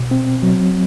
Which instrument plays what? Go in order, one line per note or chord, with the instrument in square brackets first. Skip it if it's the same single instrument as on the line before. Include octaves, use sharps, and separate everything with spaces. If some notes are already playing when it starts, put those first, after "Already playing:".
Already playing: [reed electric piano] B2
C4
F#3